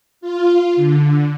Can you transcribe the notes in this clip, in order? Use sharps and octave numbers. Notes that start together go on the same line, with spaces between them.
F4
D3